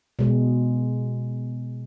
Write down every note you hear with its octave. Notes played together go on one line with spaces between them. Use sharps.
B2 G#3